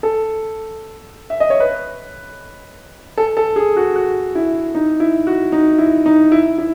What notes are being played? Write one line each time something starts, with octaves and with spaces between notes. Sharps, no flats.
A4
E5
D#5
C#5
B4
A4
A4
G#4
F#4
F#4
E4
D#4
E4
F#4
D#4
E4
D#4
E4
E4